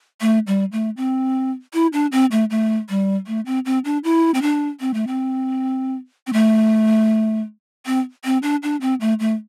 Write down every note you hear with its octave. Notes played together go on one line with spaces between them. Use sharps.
A3
G3
A3
C4
E4
D4
C4
A3
A3
G3
A3
C4
C4
D4
E4
C4
D4
C4
A3
C4
C4
A3
C4
C4
D4
D4
C4
A3
A3